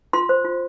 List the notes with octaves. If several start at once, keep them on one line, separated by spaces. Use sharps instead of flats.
F4 C6
C5
F4